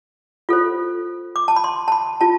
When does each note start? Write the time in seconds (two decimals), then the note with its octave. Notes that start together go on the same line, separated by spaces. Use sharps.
0.49 F4 A4 C5
1.36 D6
1.48 A5
1.56 B5
1.64 C6
1.88 A5
1.92 B5
2.21 F4 A5